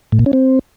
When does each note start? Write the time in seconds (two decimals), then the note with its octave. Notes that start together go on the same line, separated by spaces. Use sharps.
0.12 A2
0.19 A#2
0.26 C#4
0.33 C4